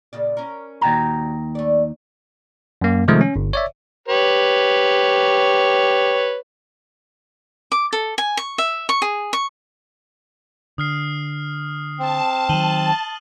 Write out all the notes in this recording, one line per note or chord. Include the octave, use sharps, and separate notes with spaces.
A#2 C#3 D5
C#4 A#4
D#2 A#2 F#4 G5 A#5
A3 D5
F#2 A#3
C3 D#3 F3 G#3 A3
C#4
G1
C#5 D5 E5
G4 B4 C#5
D6
A4
G#5
C#6
E5
C#6
G#4
C#6
D3 D#6 F6 C7
C4 A5
D#3 F#3 D#7 F#7 G7